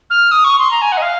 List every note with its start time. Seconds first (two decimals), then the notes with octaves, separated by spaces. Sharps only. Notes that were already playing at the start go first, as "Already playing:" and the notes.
0.10 F6
0.31 D#6
0.44 C#6
0.58 C6
0.71 A#5
0.81 G#5
0.92 F#5
0.97 D#5
1.02 F5